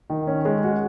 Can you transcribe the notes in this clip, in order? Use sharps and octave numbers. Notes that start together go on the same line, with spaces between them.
D#3
C#4
G#3
F#4